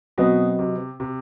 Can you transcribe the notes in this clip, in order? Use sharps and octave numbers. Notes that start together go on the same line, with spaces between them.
B2 F#3 C4 F#4 B4 D#5
C3
C3